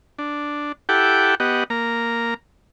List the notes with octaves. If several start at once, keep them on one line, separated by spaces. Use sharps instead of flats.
D4
E4 G4 A4 F#5 G5 D6
B3 G4 D#5 F#5
A#3 A#5